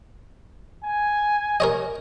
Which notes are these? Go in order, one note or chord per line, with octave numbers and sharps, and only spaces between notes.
G#5
A#4 C#5 D#5